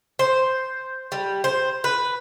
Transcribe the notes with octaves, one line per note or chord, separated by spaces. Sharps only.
C5
G3
C5
B4